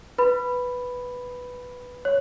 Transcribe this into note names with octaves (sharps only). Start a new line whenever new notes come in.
B4 B5
C#5